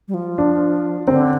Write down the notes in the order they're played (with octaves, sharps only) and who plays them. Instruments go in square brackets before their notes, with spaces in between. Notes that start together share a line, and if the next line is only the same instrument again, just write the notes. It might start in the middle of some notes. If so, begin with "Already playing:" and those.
[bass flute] G3
F3
[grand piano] D4
[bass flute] D3 [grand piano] C4